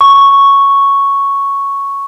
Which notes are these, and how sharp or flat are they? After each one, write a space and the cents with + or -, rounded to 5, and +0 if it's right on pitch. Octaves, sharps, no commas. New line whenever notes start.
C#6 +0